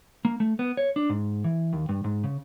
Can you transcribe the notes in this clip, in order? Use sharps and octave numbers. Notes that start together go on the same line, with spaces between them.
A#3
A3
B3
C#5
D4
G#2
E3
D#2
G2
G#2
C#3